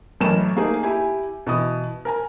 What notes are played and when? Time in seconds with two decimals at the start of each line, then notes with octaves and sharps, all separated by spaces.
0.20 A1 F#2 A3 A#4 E7
0.56 A3 A#3 D#4 G#4
0.83 E4 G4 G#5
1.47 B2 E3 D#6
2.05 A#4 G#5 A#5